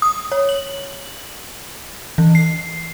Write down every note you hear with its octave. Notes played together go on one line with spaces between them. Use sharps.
D#6
C#5
F#7
E3
C7